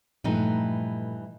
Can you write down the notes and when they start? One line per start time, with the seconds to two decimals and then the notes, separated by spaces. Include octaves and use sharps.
0.24 G2 A#2 E3 F3 A3 D#4